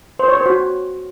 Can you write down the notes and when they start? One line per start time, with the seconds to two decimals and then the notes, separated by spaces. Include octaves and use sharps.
0.19 C5
0.28 C#5
0.37 C5
0.46 F#4